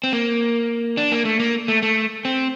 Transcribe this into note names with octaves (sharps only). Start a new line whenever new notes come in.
C4
A#3
D4
A#3
A3
A#3
A3
A3
C4